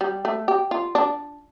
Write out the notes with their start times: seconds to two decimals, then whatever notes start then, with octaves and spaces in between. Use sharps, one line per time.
0.01 G3
0.25 A3
0.48 G4
0.71 F4
0.95 D4